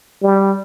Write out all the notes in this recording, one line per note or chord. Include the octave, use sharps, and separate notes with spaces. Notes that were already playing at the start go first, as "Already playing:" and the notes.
G3